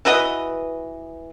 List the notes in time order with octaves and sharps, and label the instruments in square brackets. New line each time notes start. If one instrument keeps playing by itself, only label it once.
[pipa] E3 F#4 B4 D#5